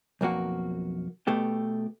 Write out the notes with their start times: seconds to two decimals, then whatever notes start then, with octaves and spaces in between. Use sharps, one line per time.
0.21 B1 F2 A#3 F#4
1.27 B2 A3 G4